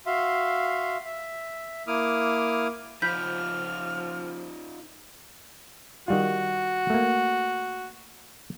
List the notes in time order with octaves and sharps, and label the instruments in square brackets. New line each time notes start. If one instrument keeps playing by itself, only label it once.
[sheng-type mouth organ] F#4 E5 F5 C6
E5
A#3 E4 D6 D#6 F6
[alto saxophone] F3 [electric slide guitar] D#4 F4 C5 [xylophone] B5 G6 B6 [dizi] F6
[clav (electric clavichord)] D#3 G3 F4 [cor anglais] F#4
[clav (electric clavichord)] A3 A#3